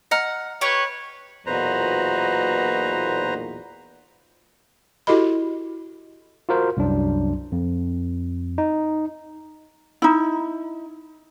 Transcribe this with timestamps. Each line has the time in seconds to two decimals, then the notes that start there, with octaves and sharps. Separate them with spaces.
0.11 D#5 F#5 A#5 F6
0.61 G4 B4 C#5 C#6
1.46 B1 E2 A#2 D#4 F#4 B4 C5 A#5
5.07 E4 F#4 G4 A4 D#5 B5
6.49 F4 F#4 A#4 C5
6.77 C2 F#2 F#3 D4
7.52 F2
8.58 D#4
10.02 D#4 E4